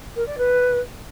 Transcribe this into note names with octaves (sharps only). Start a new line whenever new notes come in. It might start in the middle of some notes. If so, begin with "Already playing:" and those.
A#4
D5
B4